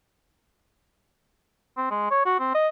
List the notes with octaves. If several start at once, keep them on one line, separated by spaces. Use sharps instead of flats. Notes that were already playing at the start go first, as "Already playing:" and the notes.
C4
G#3
C#5
F#4
C4
D#5